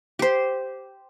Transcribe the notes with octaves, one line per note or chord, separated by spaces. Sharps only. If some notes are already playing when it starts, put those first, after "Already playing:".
G4 C5